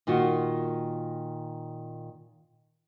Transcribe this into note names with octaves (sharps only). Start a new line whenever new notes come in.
A#2 D#3 F4 F#4